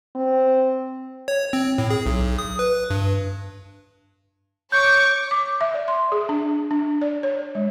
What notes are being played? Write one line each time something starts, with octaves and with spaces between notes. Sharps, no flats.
C4
C#5
C4
A2
G#4
B1
D#6
B4
G2
C#5 C#6 D6 G6
D6
E5
D5
C6
G#4
D4
D4
D5
C#5
G#3